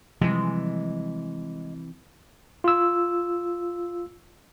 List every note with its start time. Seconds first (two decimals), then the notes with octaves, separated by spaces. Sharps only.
0.21 C3 E3 F3 G3 G#3
2.64 F4 E6